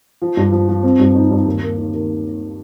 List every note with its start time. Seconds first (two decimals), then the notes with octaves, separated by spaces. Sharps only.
0.22 F3
0.37 G2
0.52 F3
0.68 F3
0.83 C4
0.99 G2
1.14 D#4
1.31 G2
1.45 D#2
1.62 A#3
1.78 D#3
1.93 D#3